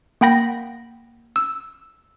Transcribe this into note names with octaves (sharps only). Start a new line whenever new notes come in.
A#3 F#5 G5 B5 A#6
E6